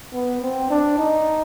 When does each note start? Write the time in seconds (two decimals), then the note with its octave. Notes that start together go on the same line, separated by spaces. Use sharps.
0.13 B3
0.41 C4
0.70 D4
0.98 D#4